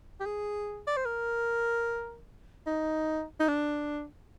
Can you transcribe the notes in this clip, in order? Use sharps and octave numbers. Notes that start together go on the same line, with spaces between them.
G4
G#4
D5
C5
A#4
D#4
D#4
D4